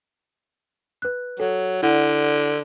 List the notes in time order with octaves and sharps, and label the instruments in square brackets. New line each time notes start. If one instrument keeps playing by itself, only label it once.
[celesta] B4 F#6
[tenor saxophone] F#3 [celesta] A4
[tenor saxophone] D3 [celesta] E4 D5 F#5